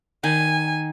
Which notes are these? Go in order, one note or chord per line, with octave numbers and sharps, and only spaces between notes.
D#3 G#5